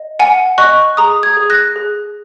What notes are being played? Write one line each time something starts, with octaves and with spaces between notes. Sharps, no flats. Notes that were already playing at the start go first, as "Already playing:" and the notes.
Already playing: D#5
F#5 G#5
D#5 C#6 F#6
G#4 A#5 D#6
D#6 G#6
G#4
F#6 A#6
G#4